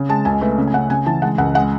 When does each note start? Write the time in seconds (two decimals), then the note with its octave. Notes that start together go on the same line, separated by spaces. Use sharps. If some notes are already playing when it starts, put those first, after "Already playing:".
Already playing: C#3
0.09 G#3 A5
0.25 C#2 G#5
0.41 A3 B4
0.58 C#3
0.67 G#5
0.74 C#3 F#5
0.90 C#3 G#5
1.06 E3 A5
1.22 G#3 F#5
1.38 C#2 F#5
1.54 G#3 F#5